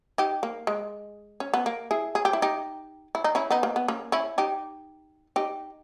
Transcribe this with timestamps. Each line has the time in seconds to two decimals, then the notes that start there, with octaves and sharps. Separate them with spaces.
0.18 D#4 G4
0.43 A#3
0.67 G#3
1.40 C#4
1.54 B3
1.66 A#3
1.91 E4 G#4
2.15 G#4
2.25 G4
2.33 E4
2.42 D#4 G4
3.15 E4
3.24 D#4
3.35 C#4 E4
3.50 B3 D#4
3.63 A#3
3.76 B3
3.88 A#3 C#4
4.12 C#4 E4
4.38 D#4 G4
5.36 D#4 G4